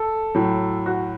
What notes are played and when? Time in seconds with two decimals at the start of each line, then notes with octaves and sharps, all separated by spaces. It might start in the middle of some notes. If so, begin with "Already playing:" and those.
Already playing: A4
0.35 A2 F#3
0.86 F#4